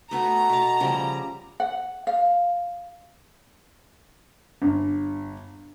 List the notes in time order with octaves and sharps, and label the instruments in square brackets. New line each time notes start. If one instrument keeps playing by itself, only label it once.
[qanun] A3 B3 F#4 [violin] A#5
[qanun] B2 A5
C#3 F3 G3
[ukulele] F#5
F5
[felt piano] G1